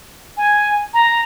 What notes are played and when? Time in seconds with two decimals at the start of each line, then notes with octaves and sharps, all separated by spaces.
0.37 G#5
0.94 A#5